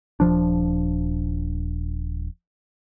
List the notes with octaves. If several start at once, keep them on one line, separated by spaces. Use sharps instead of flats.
D#1 D#2 F3 D4